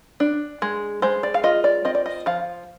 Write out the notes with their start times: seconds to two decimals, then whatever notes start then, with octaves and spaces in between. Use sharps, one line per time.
0.20 D4
0.62 G#3
1.02 G#3 C5
1.23 D5
1.34 F5
1.43 F4 D#5
1.64 D5
1.85 C4 D#5
1.95 D5
2.06 D#5
2.26 F3 F5